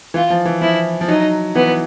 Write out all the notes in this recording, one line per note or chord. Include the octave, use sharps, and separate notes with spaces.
E3 F4
F3
E3
F3 E4
F3
F#3 D#4
E3 B3